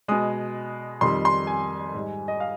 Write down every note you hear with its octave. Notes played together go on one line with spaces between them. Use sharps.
B2 G#3 D#6
F2 D#3 G3 C6
C6
G#5
G#2 G3
D#5
F5